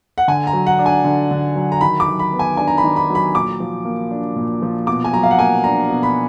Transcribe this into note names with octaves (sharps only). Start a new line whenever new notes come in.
F#5
D3 G#5
A#5
F#3
F#5
D4
G#5
D3
D3
F#3
A#5
D#3 B5
D6
F#3
B5
B3
G#5
D4 G#5
A#5
B5
D#3
B5
F#3
B5
A#2 D6
F3
A#3
D4
A#2
F3
B2 D6
G#5
F#3 A#5
F5
F#5
A#3 G#5
D4 A#5
B2
B5